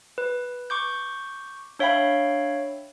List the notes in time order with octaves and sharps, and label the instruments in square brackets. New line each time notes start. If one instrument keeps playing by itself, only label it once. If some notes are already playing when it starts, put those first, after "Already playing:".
[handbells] B4
C#6 D6 G6
D4 C#5 E5 F5 G5 B5